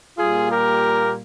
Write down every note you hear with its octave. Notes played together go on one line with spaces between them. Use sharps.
A#2 G3 A#3 F4 G#4
G4 A#4